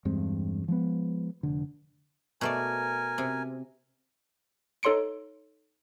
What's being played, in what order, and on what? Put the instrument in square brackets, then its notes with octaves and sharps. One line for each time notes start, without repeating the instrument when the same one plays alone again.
[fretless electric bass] E2 G2 G#3 C4
F3 G#3 B3
F1 D3
[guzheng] B2 A3 D5 [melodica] A#4 G#5
[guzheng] C3
[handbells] D#4 A4 C#5 C6 C#7 D7